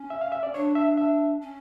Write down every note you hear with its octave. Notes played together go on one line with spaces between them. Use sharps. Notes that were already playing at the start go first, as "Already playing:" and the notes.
Already playing: C#4
E5
F5
E5
D5
D4 C#5
E5
E5
C#4